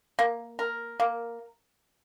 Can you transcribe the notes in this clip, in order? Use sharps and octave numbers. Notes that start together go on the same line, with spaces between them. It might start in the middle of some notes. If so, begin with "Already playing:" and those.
A#3
A#4
A#3